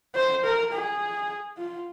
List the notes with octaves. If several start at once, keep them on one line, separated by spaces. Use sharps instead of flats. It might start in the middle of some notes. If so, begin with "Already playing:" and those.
C5
A#4
G#4
F4